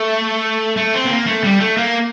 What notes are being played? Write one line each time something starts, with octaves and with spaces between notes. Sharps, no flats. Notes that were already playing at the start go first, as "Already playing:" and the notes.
Already playing: A3
A3
C4
B3
A#3
A3
G3
A3
A#3